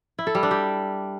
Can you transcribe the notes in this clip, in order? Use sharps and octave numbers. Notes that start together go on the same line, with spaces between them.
E4
A4
G3
D4
G4